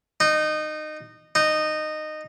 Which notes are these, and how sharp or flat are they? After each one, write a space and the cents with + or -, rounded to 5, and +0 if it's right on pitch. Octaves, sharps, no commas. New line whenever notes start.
D#4 -20
D#4 -15